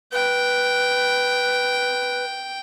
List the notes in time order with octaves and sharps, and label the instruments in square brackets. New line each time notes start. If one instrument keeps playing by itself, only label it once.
[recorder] B4 [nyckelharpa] G5